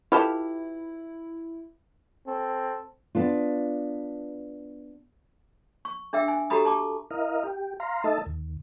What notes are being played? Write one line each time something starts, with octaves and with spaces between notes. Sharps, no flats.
E4 F4 G4 A4 B4 B5
C4 A4
B3 D4 F4
C#6
D4 G#4 E5 G5 E6
G#5
F#4 G4 A4 A#5 B5 D#6
A5 C#6 D6
E4 A#4 D#5 F5
G4
F5 A#5 C6
A3 D#4 A4 D#5 E5 A5
D#2